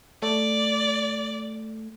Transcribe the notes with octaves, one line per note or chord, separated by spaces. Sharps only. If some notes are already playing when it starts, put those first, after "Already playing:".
A3 D5